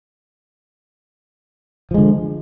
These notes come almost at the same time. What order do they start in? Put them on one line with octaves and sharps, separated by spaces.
F3 G#3 D3